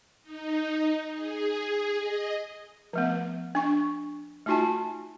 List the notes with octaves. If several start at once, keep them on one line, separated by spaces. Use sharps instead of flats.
D#4
G#4
D#5
F3 A3 B3
D4 C#6
A3 D#4 F4 F#4 G#5 A5